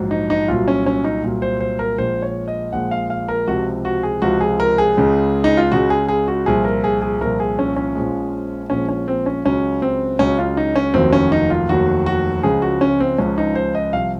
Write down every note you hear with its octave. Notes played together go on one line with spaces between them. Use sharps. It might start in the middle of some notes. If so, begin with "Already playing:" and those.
Already playing: A#1 G#2 F#3
D#4
D#4
C2 A#2 F#3 F4
C#4
C#4
D#4
C2 A#2 F#3
C5
C5
A#4
A#1 A#2 G#3 C5
C#5
D#5
A#1 A#2 G#3 F#5
F5
F5
A#4
C#2 C3 F3 F#4
F#4
G#4
C#2 C3 F3 F#4
G#4
A#4
G#4
C#2 C#3 G#3
D#4
F4
C#2 C#3 G#3 F#4
G#4
G#4
F#4
C2 A#2 F3 G#4
A#4
G#4
G#4
C2 A#2 F3 A#4
G#4
C#4
C#4
A#1 A#2 F3 G#3
A#1 A#2 F3 G#3 C#4
C#4
C4
C#4
C#2 C#3 F#3 C#4
C4
C#2 C#3 F#3 C#4
F4
D#4
C#4
F1 D#2 D#3 F#3 C4
C#4
D#4
F4
F1 D#2 D#3 F#3 F#4
F#4
C#2 C#3 F3 G#3 G#4
F#4
C#4
C4
C#2 C#3 F3 G#3 C#4
D#4
C5
D#5
C2 C3 F3 F5